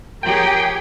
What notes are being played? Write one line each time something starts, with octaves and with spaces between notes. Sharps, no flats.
F3 G4 G#4 A#4 C#5 G5